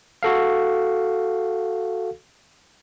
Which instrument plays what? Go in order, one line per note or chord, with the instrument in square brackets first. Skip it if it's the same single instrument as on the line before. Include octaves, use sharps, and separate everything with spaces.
[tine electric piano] F#4 A4 F5